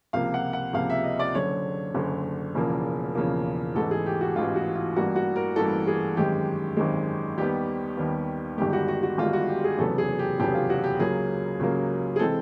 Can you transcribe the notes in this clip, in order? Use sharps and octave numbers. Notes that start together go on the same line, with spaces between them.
C#2 C3 F3 A#3 F5
F#5
F#5
C#2 C3 F3 A#3 F5
E5
D#5
D5
F#1 F#2 D3 C#5
F#1 F#2 D3
E1 E2 C#3 F3 A#3
E1 E2 C#3 F3 A#3
A1 G#2 E3 A4
G#4
G4
F#4
A1 G#2 E3 F4
F#4
F4
A1 G2 E3 G3 A#3 F#4
F#4
A#4
A1 G2 E3 G3 A#3 A4
G#4
G#1 F#2 D#3 G#3 G4
G#1 F#2 D#3 G#3
D#2 D#3 G3 B3 G4
D#2 D#3 G3 B3
G1 G2 D#3 G#3 G4
G4
F#4
F#4
F#4
G1 G2 D#3 G#3 F4
F#4
G4
G#4
F1 E2 C#3 F#3 B3 A4
G#4
G4
F1 E2 C#3 F#3 B3 G4
F4
F#4
G4
C#2 C#3 F#3 A#3 G#4
C#2 C#3 F#3 A#3
G#4
C3 E3 G#3 C4 A4